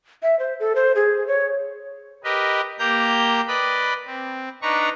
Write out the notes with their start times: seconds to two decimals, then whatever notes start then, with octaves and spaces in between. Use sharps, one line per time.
0.23 E5
0.39 C5
0.60 A4
0.75 C5
0.95 G#4
1.27 C#5
2.24 G4 A#4 B4 D#5
2.79 A#3 G4 A#5 G6
3.48 B4 D5 D#5 B5
4.06 C4
4.62 D4 D#4 B4 A#5 C#6